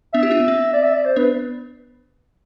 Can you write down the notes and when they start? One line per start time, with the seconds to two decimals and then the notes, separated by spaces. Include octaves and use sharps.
0.13 B3 D4 E5
0.23 E4 G4
0.31 D4 F4
0.40 B3
0.48 C4
0.73 D5
0.83 E5
0.93 D5
1.05 C5
1.16 B3 D4 B4